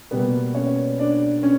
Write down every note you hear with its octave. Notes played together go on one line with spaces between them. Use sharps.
B2 G3 A#3 B3 B4
C#4 C#5
D4 D5
C#4